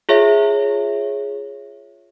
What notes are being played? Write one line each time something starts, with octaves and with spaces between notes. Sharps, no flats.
F4 G#4 C#5 E5